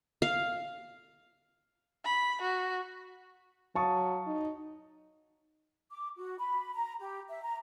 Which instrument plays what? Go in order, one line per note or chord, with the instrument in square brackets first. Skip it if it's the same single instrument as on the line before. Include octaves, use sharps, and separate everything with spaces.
[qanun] F5
[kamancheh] B5
F#4
[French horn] F#3 [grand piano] F5 C#6 D#6 [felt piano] A5
[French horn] D#4
[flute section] D6
F#4
B5
A#5
G4
E5
A#5